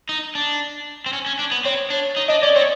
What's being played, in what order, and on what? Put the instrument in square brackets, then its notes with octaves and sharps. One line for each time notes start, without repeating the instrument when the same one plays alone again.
[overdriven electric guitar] D#4
D4
C4
C#4
C#4
D4
B3
[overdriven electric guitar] C4 [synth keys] C#5
[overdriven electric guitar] D4
D#4
[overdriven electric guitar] D4 [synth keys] D#5
[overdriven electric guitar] C#4 [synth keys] D5
[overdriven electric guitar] C4 [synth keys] C#5